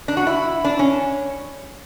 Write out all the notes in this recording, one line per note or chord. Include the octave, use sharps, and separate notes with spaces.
D4
F#4
E4
D4
C#4